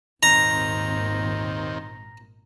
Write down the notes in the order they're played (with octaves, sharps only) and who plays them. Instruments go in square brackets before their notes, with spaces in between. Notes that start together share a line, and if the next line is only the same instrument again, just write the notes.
[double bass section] G#1 A#2 [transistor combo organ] D#2 D#3 C4 [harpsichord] A#5